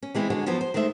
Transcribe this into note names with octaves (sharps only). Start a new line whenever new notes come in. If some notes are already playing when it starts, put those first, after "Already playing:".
C#4
E3 G#3 C4 E4
D3 G#3 F#4 C#5
E2 F3 F#3 B3 F#4 C5
C5
D#3 G#3 A3 C5 E5